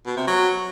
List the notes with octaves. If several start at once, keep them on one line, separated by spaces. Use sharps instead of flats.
B2
C3
F#3